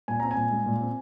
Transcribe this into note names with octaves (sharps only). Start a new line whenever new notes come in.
A#2 G#5
C4 A#5
G#5
A#2
G#3
A#2
C4